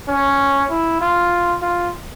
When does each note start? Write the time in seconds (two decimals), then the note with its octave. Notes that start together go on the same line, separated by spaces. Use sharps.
0.08 C#4
0.70 E4
1.01 F4
1.62 F4